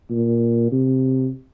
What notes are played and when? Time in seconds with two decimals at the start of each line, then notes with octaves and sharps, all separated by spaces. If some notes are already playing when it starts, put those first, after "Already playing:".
0.10 A#2
0.72 C3